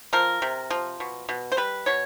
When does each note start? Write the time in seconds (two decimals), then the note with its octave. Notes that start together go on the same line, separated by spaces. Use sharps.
0.13 F3 A#4
0.42 C3
0.70 F3
1.00 B2
1.29 B2
1.52 C5
1.57 G3 B4
1.86 B2 C#5